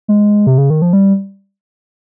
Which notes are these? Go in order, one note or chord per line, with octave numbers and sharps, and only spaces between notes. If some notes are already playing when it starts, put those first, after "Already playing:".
G#3
C3
C#3
D#3
F3
G3